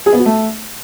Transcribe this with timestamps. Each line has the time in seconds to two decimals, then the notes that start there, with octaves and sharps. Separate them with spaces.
0.06 G#4
0.13 B3
0.19 F#4
0.25 A3